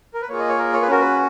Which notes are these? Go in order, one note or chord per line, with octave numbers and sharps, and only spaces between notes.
A#4
B4
A#3 F4 G#4 C#5
D#5
C#5
A#4
C#5
B4
C#4 F#4 A#4
B4